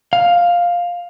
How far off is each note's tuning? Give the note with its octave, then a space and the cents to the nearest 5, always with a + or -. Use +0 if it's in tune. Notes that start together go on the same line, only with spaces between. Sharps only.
F5 +5